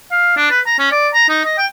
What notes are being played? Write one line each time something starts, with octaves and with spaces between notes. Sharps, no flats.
F5
D4
B4
A#5
C#4
D5
A#5
D#4
D#5
G5